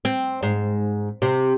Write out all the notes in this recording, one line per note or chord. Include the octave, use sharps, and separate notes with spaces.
C4
G#2
C3